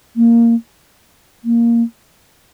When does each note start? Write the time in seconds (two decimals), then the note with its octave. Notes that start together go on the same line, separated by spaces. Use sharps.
0.16 A#3
1.45 A#3